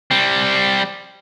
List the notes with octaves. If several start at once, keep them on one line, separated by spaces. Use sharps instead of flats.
G3 C4